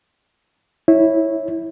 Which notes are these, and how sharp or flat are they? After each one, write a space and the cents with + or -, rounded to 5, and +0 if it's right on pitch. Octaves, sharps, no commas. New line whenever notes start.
E4 -10 C#5 -10